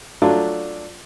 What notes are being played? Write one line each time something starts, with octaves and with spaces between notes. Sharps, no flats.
F#3 A3 D4 F4